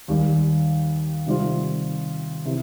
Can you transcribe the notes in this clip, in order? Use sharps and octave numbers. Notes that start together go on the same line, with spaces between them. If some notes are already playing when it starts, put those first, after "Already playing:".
D#2 D#3 G3
C3 D#3 G3 C4 F4
C3 E3